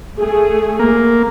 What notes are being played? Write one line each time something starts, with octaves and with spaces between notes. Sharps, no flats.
A3 G#4
A#3